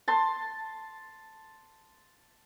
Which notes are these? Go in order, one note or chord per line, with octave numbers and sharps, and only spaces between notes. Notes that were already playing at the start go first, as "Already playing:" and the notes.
A5 C6